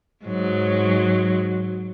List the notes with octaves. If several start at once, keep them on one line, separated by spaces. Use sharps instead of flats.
G#2 F#3